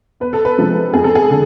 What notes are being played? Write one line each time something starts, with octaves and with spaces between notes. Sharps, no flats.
E2 B4
A4
B4
C3 F3 G#3
F2 G#4
A4
G#4
D3